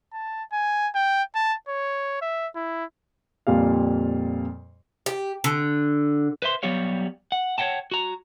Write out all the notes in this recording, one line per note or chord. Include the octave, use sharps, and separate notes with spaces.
A5
G#5
G5
A5
C#5
E5
E4
F2 A#2 G3 F5
G4
D3
B4 C5 E5 C6
F#3 G3 B3 G4 C#5 F5
F#5
C#5 D#5 F#5 G5 A5
F#4 A#5